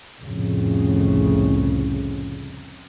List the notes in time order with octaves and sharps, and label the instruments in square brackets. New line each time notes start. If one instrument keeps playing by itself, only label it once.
[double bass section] C2 F2 A2 C#3